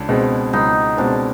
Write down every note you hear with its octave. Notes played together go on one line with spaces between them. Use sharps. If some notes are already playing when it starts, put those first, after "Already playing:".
Already playing: C#2 D4
B2 G#3 C4
C#2 D#4
B2 G#3 C4 D4